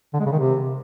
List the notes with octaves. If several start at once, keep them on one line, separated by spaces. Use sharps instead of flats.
D3
G#3
C#3
D#3
C3